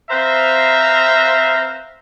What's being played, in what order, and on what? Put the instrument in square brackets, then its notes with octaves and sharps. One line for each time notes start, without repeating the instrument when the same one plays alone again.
[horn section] C4 B4 C5 E5 F5 A#5